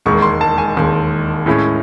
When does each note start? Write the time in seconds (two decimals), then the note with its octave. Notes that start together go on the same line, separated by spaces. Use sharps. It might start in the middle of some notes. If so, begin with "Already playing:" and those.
0.06 E1 D#2 D#3 G#3 C#6
0.22 C6
0.41 A5
0.58 G#5
0.76 E1 D#2 D#3 G#3
1.46 A2 G#3 C#4 E4